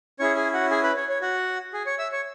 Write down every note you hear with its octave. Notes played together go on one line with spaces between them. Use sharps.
C#4 E4 G#4 C#5 C#6
G#4 G#5
F#4 F#5
G#4 G#5
B4 B5
C#5
C#5
F#4 F#5
G#4 G#5
C#5 C#6
E5 E6
C#5 C#6